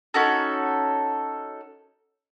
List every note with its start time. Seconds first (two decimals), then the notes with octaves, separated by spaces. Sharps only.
0.14 C#4 D#4 F#4 A4